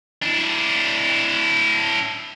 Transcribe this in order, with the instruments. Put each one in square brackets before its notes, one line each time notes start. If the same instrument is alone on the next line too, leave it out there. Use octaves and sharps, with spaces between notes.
[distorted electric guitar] D4 E4